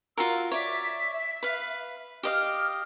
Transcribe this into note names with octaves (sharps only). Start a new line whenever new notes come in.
F4 F#4 A#4 E6
C#5 D5 E5
B4 F5
G4 D#5 F5 F6